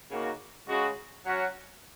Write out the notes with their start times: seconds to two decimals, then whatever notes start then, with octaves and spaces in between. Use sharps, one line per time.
0.11 C#3 A#3 D#4 F#4
0.68 C#3 G#3 F#4
1.26 F#3 C#4 F#4